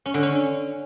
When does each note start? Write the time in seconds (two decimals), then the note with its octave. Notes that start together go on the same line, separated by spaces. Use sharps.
0.06 C#4
0.14 D3
0.23 C#4